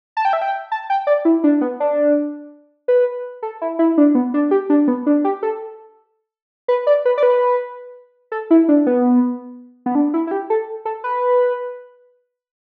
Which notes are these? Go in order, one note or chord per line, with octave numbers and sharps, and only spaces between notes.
A5
G5
E5
G5
A5
G5
D5
E4
D4
B3
D4
B4
A4
E4
E4
D4
B3
D4
G4
D4
B3
D4
G4
A4
B4
D5
B4
D5
B4
A4
E4
D4
B3
B3
D4
E4
E4
G4
A4
A4
B4